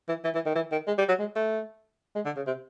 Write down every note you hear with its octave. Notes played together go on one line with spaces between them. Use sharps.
E3
E3
E3
D#3
E3
D#3
G#3
G3
F#3
G#3
A3
G#3
D3
C#3
C3